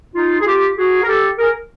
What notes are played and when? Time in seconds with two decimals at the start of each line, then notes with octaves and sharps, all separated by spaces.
0.14 D#4 F4
0.40 G#4
0.46 F4 G4
0.77 F#4 G#4
1.03 A#4
1.08 G4 A4
1.39 G#4 A#4